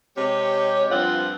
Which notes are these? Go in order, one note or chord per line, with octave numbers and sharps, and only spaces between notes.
C3 G#3 G4 C#5
G2 F3 C4 F4 F#5